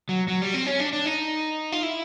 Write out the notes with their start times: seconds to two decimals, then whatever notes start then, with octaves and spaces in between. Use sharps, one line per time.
0.09 F#3
0.28 F#3
0.42 G3
0.54 C4
0.66 C#4
0.80 D4
0.93 D4
1.06 D#4
1.72 F4
1.83 E4